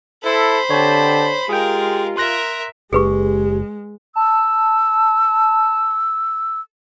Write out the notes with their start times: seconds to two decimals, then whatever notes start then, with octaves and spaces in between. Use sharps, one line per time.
0.24 E4 A4 C5 B5
0.70 D3 C4 G4 C#5 A5
1.49 G#3 F4 G4 G#4 A#4 G5
2.17 A#4 E5 C6 F#6 A#6
2.93 F#1 G#3 G4 G#4 B4 C#6
4.16 A5 E6